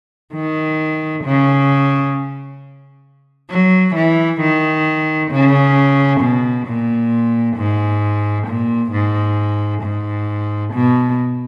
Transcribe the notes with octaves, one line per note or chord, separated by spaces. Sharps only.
D#3
C#3
F#3
E3
D#3
C#3
B2
A#2
G#2
A#2
G#2
G#2
B2